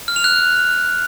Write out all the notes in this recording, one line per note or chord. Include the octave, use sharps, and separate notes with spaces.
F6
F7
F#6